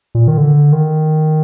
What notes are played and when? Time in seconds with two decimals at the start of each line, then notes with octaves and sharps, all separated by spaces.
0.15 A#2
0.27 D#3
0.38 D3
0.72 D#3